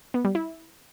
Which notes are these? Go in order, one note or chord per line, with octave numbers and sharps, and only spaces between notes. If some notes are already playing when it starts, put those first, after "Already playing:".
B3
G3
E4